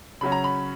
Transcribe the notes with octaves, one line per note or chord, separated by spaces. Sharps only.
C#3 F#3 C#4 B5
A#5
B5